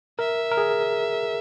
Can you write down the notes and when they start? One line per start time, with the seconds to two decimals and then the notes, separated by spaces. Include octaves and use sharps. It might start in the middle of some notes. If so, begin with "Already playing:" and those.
0.19 A#4 E5
0.52 A#4
0.57 G#4